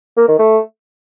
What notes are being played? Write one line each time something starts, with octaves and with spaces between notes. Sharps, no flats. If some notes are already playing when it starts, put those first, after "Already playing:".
A#3
D#3
A3